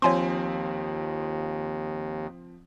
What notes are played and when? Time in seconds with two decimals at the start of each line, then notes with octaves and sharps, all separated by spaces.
0.02 D#2 F3 C4 C#5 G#5 C6